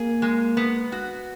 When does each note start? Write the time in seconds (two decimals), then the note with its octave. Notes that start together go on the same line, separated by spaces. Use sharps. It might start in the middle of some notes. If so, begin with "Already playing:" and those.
Already playing: A#3 G#4
0.22 G#3
0.57 B3
0.92 F#4